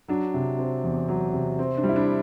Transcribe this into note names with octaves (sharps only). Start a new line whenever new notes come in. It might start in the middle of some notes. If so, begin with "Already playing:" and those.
F#3 D4
C3
C4
E2
F#3
C3
C4
D4
G3
E4
D4